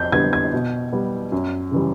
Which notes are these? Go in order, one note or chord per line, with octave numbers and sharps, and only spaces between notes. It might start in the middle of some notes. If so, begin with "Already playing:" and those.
Already playing: F2 G6
D3 G3 B3 G#6
G#6
B2
G3 B3
F#2
C#3 E3 G3